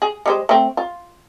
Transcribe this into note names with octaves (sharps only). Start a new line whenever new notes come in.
G#4
G3 G#3 C5
A3 C4
F4